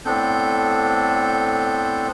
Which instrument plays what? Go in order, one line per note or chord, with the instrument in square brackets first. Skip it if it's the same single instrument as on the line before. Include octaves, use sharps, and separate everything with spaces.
[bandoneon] A2 B3 C4 D4 A4 G6